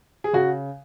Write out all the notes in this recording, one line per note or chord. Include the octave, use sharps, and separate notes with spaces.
G#4
C#3 F#4